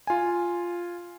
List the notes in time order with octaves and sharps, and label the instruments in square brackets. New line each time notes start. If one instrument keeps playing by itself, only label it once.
[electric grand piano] F4 G#5